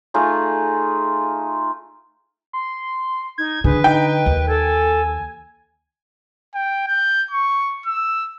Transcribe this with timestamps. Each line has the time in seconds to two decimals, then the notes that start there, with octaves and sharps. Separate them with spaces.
0.14 A3 D#4 F4 G#4
2.53 C6
3.38 D#4 G#6
3.64 D3 G#4 B4
3.84 D#4 G5
4.26 D#2
4.48 A4 G#5
6.55 G5
6.88 G6
7.31 C#6
7.86 E6